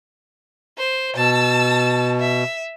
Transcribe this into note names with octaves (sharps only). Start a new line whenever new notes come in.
C5
B2 A5 E6
E5